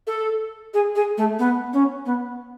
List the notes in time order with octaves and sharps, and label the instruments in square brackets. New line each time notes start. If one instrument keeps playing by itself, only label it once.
[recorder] A4
G#4
G#4
A3
B3
C#4
B3